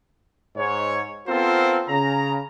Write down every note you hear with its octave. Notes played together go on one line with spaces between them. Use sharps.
G#2 C#5
B3 C4 F4 A4 A#4 C5
C#3 A#5